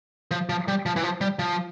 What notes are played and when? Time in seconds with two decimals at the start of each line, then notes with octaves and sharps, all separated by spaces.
0.31 F3
0.49 F3
0.68 G3
0.86 F3
0.96 E3
1.04 F3
1.21 G3
1.39 F3